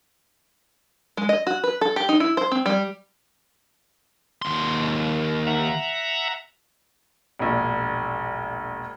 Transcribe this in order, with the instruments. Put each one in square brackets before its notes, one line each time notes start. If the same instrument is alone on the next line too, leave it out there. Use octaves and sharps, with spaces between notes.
[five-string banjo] G#3
D#5
F#4
B4
A4
G4
D#4
E4
C5
C4
G3
[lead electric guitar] D#2 C6
[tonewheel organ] E5 F#5 A#5
[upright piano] E1 A#1